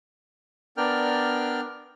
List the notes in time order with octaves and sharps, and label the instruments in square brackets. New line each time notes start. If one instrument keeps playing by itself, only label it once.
[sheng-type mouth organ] B3 D4 A#4 D5 G5 F6